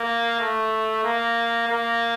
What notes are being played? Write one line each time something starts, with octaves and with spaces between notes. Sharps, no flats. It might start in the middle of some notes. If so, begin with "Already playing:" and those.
Already playing: A#3
A3
A#3
A#3